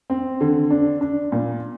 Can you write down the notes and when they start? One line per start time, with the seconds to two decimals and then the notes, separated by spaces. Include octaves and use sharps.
0.10 C4
0.40 D3
0.70 D4
1.01 D4
1.32 A#2